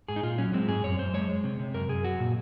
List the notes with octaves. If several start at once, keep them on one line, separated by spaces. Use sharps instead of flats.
G#2 G#4
D#4
A#2 F4
F#3 C#4
G#3 C4
G#2 G#4
F#2 C#5
F#2 C5
G#3 C#5
G#3
C3
C3
F#2 A#4
F#2 G#4
F#3 F#4
A#2